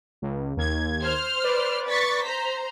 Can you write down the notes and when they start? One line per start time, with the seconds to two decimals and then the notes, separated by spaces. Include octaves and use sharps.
0.22 C#2
0.57 D#2 G#6
1.02 C5 F6
1.44 B4 D5
1.88 C#6 A6 B6
2.24 C5 A#5 B6